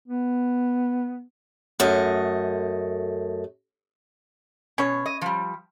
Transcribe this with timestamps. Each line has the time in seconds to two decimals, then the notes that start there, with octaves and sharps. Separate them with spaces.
0.08 B3
1.80 F#2 A3 D#5
4.78 B2 C#4 C#5
5.06 D#5
5.21 F3 G3